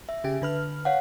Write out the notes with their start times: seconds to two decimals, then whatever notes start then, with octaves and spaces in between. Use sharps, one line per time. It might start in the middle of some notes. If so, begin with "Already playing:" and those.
0.09 E5
0.24 C#3 G4
0.42 D3 B4 F6
0.85 C#5 F5 F#5